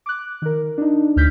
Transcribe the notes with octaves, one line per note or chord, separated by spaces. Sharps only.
D6 F#6
D#3 A#4
D4 D#4
D2 F6 G6 B6